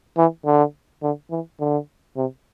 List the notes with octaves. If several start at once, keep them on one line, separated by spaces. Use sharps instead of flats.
E3
D3
D3
E3
D3
C3